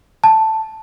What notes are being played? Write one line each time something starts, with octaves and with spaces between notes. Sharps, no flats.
A5